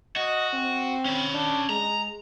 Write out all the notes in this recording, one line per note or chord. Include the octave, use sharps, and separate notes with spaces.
F#4 D#5
C4
C#4 B5
D4
G#3 A#5